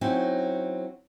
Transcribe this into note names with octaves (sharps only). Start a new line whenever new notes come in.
F#3 C4 C#4 D#4 E4